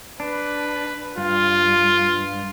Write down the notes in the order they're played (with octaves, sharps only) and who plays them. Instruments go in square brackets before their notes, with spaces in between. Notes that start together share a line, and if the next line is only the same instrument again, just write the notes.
[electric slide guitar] D4 [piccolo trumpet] B4
[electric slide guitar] G2 [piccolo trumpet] F4